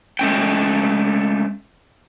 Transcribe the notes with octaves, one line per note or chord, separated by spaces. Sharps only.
G#3 A3 C#4 G5